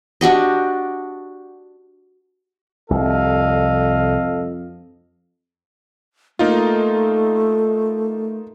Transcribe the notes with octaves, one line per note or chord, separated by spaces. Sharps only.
D4 F#4 G4 D#5
C2 F2 A4 D#5 F5
A3 A#3 D#4 F4